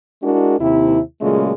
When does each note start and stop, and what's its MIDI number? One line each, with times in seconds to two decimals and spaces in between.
0.23 0.55 56
0.23 0.55 62
0.23 0.55 64
0.23 0.55 66
0.23 0.55 68
0.23 0.55 70
0.59 0.99 39
0.59 0.99 48
0.59 0.99 64
1.21 1.53 46
1.21 1.53 49
1.21 1.53 54
1.21 1.53 56
1.21 1.53 57
1.21 1.53 65